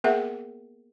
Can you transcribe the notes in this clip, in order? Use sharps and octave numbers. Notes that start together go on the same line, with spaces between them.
A#3 B3 G#4 A#4 E5 F#5